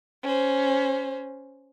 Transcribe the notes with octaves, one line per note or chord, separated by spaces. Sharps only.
C#4 C5